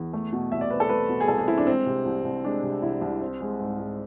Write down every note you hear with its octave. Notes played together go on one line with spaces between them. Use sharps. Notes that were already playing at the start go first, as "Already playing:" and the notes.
Already playing: E2
A3
B2
C2 E5
D5
C4 B4
A4
A3 B4
B2
G#4
C2 A4
G#4
C4 E4
D4
G#3 C4
C3
C2
C2
G#3 D4
C3
C2 E4
C2
C4
G#3
G#2
G#2